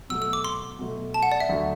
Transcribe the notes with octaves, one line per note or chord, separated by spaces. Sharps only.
B2 F#3 A3 E6
E6
D6
C6
B2 F#3 A3
A5
F#5
D5
E5
D2 D3 F#3 A3